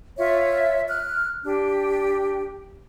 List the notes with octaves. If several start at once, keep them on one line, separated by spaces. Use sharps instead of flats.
F4 C#5 E5
F6 F#6
D4 G4